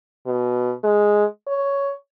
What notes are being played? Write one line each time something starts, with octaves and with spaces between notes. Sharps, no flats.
B2
G#3
C#5